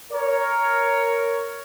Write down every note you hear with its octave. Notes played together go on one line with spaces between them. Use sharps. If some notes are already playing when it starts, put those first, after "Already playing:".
A#4 C#5